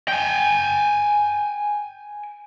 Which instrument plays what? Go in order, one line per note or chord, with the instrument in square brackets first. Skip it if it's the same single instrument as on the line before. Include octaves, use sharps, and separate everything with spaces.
[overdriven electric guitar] G5 G#5